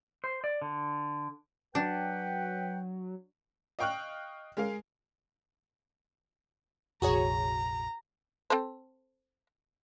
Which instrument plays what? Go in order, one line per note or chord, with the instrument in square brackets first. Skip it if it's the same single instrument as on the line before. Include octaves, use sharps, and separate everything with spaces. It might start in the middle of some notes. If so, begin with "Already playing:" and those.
[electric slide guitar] C5
D5
D3
[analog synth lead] F#3 [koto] D4 [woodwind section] B4 F#5 G5
[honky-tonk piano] D#5 F5 G5 C#6 F6 F#6
G#3 G#4 A#4 F5
[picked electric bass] F1 A#1 [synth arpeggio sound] F#4 G#4 C#5 [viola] A#5
[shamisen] C4 A4 C5